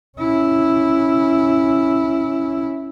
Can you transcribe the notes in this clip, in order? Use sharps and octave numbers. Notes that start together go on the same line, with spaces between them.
C#4 E4